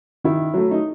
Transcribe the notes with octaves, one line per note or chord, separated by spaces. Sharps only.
D#3 E4
F#3 A3
D#4